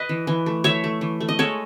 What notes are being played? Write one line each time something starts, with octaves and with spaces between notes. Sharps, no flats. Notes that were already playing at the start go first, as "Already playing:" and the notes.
Already playing: B4 D#5
E3
E3
A3
A3 C#5 E5
A3
E3
A3
D#5
G#3 A4 C#5